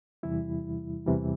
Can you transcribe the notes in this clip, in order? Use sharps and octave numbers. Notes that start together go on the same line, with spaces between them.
E2 C3 E3 G3 E4
E2 C3 E3 G3